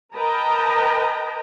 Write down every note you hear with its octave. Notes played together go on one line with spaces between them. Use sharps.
A#4 B4 D#5 G5 A5 A#5